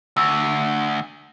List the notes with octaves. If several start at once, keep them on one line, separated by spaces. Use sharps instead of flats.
D2 E6